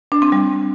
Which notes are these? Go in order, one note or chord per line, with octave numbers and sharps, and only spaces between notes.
D4
C4
G3